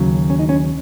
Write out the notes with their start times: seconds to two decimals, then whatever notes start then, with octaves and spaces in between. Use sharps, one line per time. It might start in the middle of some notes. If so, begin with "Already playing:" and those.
Already playing: D#2 C#3 F#3
0.30 C#4
0.39 D#4
0.49 C#4